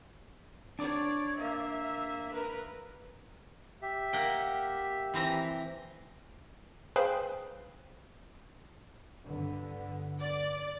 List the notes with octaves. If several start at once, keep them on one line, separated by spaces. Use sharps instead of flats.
D4 C#5 D5 D6
A#3 E5
A#4 B4
G4 E5
A#3 F#5 G5
E3 C4 A#5
G#4 B4 C5 F5 G5 B5
G2 D3 B3
D5